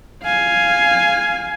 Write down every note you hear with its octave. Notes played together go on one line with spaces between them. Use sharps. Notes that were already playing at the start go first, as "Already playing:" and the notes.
F5 G#5